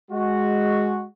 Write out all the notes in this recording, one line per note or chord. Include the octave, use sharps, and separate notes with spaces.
G#3 F#4